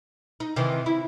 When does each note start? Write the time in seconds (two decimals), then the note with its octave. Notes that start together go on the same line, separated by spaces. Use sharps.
0.40 D#4
0.56 C3 D#3 E3
0.86 E4